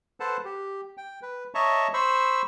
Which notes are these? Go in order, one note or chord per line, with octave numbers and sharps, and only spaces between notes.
A4 B4 C5 F#5 A5
G4
G5
B4
C#5 D#5 E5 A5 A#5 C#6
C5 B5 C#6 E6